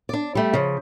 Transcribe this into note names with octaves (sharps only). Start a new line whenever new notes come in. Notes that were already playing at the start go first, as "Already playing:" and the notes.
D4 D5
G3 A3
C#3 F3